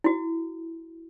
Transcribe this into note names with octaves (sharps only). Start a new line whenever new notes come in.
E4 F#4